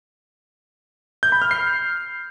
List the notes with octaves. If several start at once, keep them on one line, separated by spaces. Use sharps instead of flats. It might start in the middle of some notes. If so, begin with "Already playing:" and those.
G6
B5
F6
C7